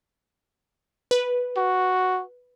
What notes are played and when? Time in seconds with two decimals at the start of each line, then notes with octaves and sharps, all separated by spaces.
1.11 B4
1.57 F#4